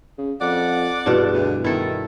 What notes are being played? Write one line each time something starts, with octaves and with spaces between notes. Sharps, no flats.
C#3
F2 D5 F#5
E2 G2 B2 D4
D2
B2 D#3 E4 A4